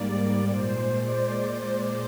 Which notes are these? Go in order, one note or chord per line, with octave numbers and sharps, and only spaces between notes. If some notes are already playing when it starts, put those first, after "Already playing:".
Already playing: G#2 G3 A#3 D5
A#2 G#3 C5
D5